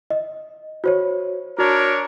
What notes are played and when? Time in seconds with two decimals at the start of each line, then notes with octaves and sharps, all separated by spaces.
0.10 D#5
0.84 F#4 C5 C#5
1.59 D4 F#4 A#4 C#5